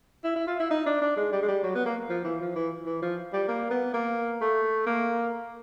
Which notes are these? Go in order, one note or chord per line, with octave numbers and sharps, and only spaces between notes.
E4
E4
F4
E4
D#4
D4
D4
G#3
G3
G#3
G3
F#3
B3
A#3
F3
E3
F3
E3
E3
F3
G3
A#3
B3
A#3
A3
A#3